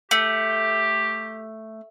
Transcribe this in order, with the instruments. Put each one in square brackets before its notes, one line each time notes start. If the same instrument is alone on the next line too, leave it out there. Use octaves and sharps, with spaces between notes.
[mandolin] A3 [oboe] G4